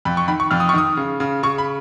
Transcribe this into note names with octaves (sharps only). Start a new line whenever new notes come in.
F2 B5
C#6
D#3 B5
C#6
F2 F6
D#6
C#6
D#3 D#6
C#3
C#3
C#3 C#6
B5